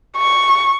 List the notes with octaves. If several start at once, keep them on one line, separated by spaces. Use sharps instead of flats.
C#6